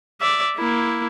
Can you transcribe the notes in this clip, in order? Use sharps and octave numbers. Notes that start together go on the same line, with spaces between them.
D5 E5
A#3 E4